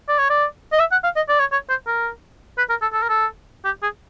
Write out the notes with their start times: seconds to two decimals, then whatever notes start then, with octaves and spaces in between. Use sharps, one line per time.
0.08 D5
0.18 C#5
0.30 D5
0.72 D#5
0.79 E5
0.92 F#5
1.04 F5
1.16 D#5
1.29 D5
1.40 C#5
1.52 C#5
1.69 C5
1.87 A#4
2.58 B4
2.70 A#4
2.82 A4
2.93 A4
3.02 A#4
3.09 A4
3.65 G4
3.83 G#4